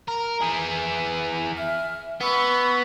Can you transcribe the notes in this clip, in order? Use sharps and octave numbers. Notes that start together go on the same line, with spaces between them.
A#4
E3 G#4
E5 F6
B3 B5 C#6 E6